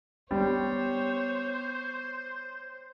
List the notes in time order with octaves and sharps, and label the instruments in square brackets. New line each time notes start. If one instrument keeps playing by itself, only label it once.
[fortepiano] G3 [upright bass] B3 [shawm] C5 [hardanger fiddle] C#5